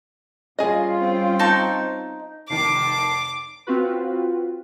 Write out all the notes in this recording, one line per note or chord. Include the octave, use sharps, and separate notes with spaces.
G3 C#4 F4 G#4 D#5
C4
D#4 A5 C#6
F1 D#3 A5 D6 C7
C4 F4 F#4 B4